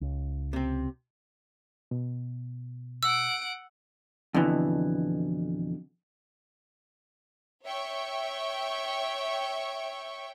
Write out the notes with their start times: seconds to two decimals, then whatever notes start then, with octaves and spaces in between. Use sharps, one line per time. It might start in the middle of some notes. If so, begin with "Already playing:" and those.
0.01 C#2
0.53 C3 C4
1.91 B2
3.03 F#5 E6 D7
4.34 F2 B2 D3 E3
7.65 C#5 E5 G5 C#6